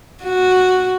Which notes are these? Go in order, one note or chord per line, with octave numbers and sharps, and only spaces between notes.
F#4